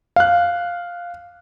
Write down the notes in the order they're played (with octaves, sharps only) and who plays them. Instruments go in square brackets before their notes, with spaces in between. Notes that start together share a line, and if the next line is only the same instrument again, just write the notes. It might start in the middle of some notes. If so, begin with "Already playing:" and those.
[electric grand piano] F5 F#6